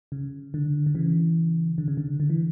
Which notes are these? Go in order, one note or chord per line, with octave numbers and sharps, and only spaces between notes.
C#3
D3
D3
C#3 E3
D3
C#3
D3
D3
E3